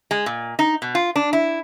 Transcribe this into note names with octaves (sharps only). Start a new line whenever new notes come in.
G#3
A#2
D#4
B2
F4
D4
E4